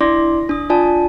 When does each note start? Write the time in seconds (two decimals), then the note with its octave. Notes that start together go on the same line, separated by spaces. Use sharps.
0.01 D4 E4 D5 C6 D6 A#6
0.49 D4 D#6
0.70 D4 F4 D5 G#5 A5